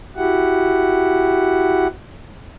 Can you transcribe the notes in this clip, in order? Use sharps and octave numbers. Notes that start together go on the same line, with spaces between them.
E4 F#4 G4 F#5